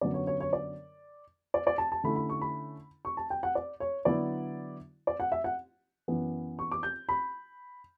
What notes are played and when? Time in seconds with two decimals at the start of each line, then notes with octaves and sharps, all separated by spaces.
0.01 F#2 D3 F#3 B3 D5
0.14 C#5
0.27 C#5
0.40 C#5
0.53 D5
1.54 D5
1.67 D5
1.78 A5
1.92 A5
2.04 D3 A3 C#4 E4 B5
2.16 B5
2.29 C#6
2.41 B5
3.05 C#6
3.17 A5
3.30 G5
3.43 F#5
3.55 D5
3.80 C#5
4.05 D3 F#3 B3 E4 D5
5.07 D5
5.20 F#5
5.32 E5
5.44 F#5
6.08 F#2 E3 B3
6.59 C#6
6.72 D6
6.83 G6
7.09 B5